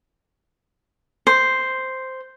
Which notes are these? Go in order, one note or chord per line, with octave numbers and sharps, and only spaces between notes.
C5